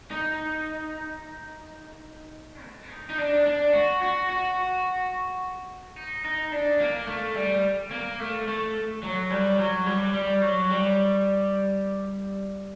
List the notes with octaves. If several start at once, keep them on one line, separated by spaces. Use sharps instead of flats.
D#4
A3
D#4
D#4
D4
D4
F#4
F#4
F#4
D#4
D#4
D4
A#3
A3
G3
A#3
A3
A3
F#3
G3
F#3
G3
G3
F#3
G3